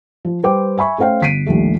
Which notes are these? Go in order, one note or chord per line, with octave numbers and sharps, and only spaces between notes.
F3
G3 B4 C5 G5 D6
E5 G#5 B5 C#6
A3 C#4 C5 F5 G5
G1 B6 C7 D7 D#7
A#1 D#2 G3 A3